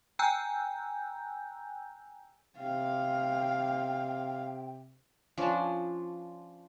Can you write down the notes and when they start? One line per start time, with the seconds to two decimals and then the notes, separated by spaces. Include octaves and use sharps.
0.19 G5 G#5 A#5 E6 F#6 G6
2.58 C3 F5 G5
5.38 F3 C#4 D4